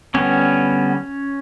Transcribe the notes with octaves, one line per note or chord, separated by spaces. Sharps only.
D3 G3 B3 C#4